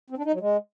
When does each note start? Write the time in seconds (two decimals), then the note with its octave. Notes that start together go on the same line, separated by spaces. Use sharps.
0.10 C4
0.18 D4
0.25 D#4
0.33 F#3
0.40 G#3